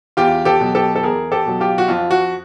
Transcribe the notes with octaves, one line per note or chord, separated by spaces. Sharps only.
E2 F4 G4
G4 A4
B2 F#3
G4 A4
A4
E2 G#4 A#4
G4 A4
B2 F#3
F4 G4
F#4
F2 F4
F#4